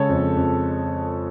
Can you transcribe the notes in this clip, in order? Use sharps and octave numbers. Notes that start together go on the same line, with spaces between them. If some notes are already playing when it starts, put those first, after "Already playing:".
Already playing: C#3 G#3 A4 C#5
F2
F2